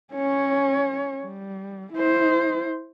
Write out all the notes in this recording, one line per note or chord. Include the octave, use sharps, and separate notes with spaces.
C#4 C#5
G3
E4 C5